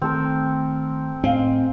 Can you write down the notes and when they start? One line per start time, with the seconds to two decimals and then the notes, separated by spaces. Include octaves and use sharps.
0.02 D#3 A3 C4 A4 A#4
1.24 A2 C4 D#5 F5 G#5